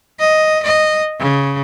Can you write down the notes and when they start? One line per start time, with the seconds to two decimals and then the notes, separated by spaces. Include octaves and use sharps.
0.20 D#5
0.63 D#5
1.19 C#3